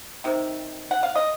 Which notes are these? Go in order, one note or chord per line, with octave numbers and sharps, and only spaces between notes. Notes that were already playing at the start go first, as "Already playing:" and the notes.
C3 D#3
F#5
F5
D#5